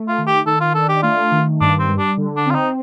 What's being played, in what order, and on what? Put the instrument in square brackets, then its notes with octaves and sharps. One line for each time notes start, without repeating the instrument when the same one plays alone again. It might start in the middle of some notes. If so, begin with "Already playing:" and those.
Already playing: [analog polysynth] A3
[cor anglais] F4
[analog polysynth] D#3
[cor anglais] G4
[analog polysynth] D#3 [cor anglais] A4
[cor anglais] F4
[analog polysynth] D4 [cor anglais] A4
[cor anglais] G4
[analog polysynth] A3 [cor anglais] F4
[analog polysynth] D#3
[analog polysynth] G2 [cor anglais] D4
[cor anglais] C4
[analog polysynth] G3
[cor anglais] D4
[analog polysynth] D3
[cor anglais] D4
[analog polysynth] C4 [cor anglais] F4
[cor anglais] D#4